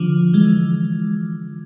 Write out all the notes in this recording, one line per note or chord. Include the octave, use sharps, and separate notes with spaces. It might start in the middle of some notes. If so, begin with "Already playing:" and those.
Already playing: D3 F3
E3 G#3